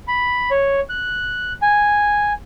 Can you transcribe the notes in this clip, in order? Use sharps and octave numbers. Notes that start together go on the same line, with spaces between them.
B5
C#5
F#6
G#5